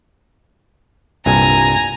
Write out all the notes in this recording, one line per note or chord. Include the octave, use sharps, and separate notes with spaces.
C2 G2 A#2 G#5 A#5